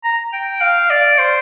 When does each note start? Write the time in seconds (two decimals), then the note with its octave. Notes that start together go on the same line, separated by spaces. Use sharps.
0.04 A#5
0.33 G5
0.61 F5
0.90 D5
1.18 C5